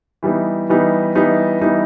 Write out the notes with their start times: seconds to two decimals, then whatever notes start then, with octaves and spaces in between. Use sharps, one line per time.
0.23 E3 G3 B3 D#4
0.69 E3 G3 B3 D#4
1.15 E3 G3 B3 D#4
1.61 E3 G3 B3 D#4